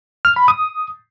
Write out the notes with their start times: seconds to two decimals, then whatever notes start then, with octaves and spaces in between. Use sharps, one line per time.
0.25 F6
0.36 B5
0.48 D#6